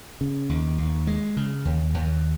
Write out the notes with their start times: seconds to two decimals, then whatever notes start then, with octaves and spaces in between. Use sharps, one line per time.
0.21 C#3
0.49 D#2
0.78 D#2
1.07 G#3
1.37 C#3
1.65 D#2
1.94 D#2